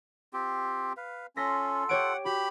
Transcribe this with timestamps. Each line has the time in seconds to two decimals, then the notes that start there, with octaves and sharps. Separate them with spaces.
0.33 C4 F4 G4
0.97 B4 F5
1.37 C#4 F4 A4 C6 A#6 B6
1.89 G4 C#5 F#5 D7
2.25 F#4 G4 B5